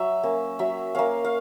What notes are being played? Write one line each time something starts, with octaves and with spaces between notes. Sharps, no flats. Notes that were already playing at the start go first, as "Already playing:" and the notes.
Already playing: F#3 E5
A#3 C#4
F#3 E5
A#3 C#4 F5
F5